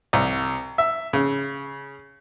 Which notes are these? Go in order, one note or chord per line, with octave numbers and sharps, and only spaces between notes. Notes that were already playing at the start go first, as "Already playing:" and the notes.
C2
E5
C#3